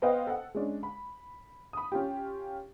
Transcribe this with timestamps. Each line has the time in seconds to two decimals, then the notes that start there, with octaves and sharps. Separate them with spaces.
0.02 B3 B4 C5 D#5 F5 G5
0.27 A4 F#5
0.54 G#3 C#4 D4
0.83 B5
1.73 B5 D#6
1.92 C#4 F4 G4